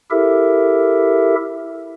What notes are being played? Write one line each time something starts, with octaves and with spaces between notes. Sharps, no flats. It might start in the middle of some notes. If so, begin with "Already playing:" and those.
E4 G4 A4 A#4 E5